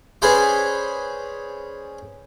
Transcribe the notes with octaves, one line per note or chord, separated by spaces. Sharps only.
C#4 G#4 B4 C5 D5